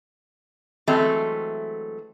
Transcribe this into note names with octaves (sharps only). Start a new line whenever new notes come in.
E3 F#3 G#3 A3 C4